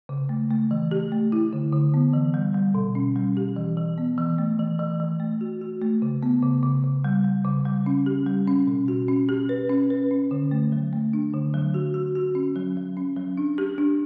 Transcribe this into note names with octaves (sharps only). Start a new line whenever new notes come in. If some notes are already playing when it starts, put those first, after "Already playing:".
C#3
A3
A3
E3
G4
A3
E4
D3
D3
B3
E3
G3
G3
B2
C#4
G3
G4
E3
E3
B3
E3
A3
E3
E3
E3
A3
F#4
F#4
A3
C#3
B3
C#3
C#3
C#3
G3
G3
C#3
G3
C#4
G4
G3
C#4
B2
F#4
C#4
G4
B4
C#4
B4
C#4
D3
A3
F#3
A3
D4
D3
F#3
F#4
F#4
F#4
C#4
F#3
F#3
C#4
F#3
D4
G4
D4